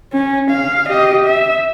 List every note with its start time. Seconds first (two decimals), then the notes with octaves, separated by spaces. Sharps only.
0.13 C#4
0.51 F5
0.89 G4 D#5
1.26 E5